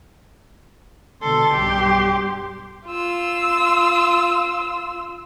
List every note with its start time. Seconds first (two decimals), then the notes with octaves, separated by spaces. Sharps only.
1.22 B2 D3 A4 C6
1.53 B1 G2 G4
2.87 F4 E6